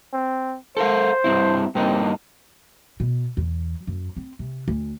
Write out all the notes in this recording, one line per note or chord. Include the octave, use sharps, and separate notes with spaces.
C4
A4 A#4 C5 F5
G2 C4 E4
G2 A#3 C4 D#4
B2
E2
F#2
C4
C3
D2